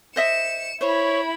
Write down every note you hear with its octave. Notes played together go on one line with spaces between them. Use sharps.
C5 D#5 E5 C#7 E7
E4 C5 C#5 B5